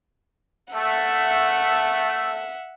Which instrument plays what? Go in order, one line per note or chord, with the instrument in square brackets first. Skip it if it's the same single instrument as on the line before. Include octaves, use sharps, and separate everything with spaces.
[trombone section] A3 [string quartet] E5 F#5